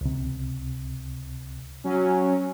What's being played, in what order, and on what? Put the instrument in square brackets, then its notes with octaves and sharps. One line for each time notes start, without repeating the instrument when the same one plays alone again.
[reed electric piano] C#2 C3
[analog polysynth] F#3 C#4